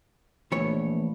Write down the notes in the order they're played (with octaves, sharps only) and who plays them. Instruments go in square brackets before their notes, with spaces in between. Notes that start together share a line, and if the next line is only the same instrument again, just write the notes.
[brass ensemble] A#1 [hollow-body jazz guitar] E3 B3 C#5 [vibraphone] A3